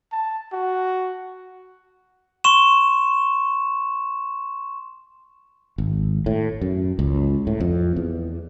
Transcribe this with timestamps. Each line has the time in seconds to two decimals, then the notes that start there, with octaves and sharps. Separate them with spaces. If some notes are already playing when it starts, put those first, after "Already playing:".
0.12 A5
0.53 F#4
2.44 C6 C#6 E7
5.78 G#1
6.26 A2
6.61 F#2
6.99 C#2
7.47 A2
7.60 F2
7.96 E2